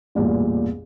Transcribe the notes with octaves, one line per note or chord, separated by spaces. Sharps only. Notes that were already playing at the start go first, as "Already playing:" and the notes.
A1 E2 G2 A#2